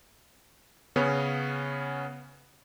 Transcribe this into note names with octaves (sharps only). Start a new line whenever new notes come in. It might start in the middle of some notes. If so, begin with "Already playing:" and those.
C#3 B3 C#4